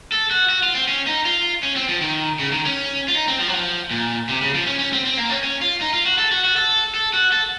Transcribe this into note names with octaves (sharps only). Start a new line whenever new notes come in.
A4
F#4
F#4
F4
C4
C#4
D#4
F4
C#4
C4
F3
D#3
C#3
D#3
C#4
F4
D#4
C4
F3
F#3
F3
A#2
C3
C#3
F3
C#4
C#4
C4
C4
A#3
C#4
C#4
F4
D#4
F4
F#4
A4
F#4
F#4
A4
A4
F#4
A4